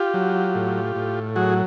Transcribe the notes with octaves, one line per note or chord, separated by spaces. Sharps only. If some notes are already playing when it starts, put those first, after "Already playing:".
Already playing: F4 G4
F#3
A2
A2
F#3 F#4 G#4